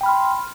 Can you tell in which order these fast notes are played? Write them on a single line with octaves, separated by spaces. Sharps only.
G5 B5 F6 C6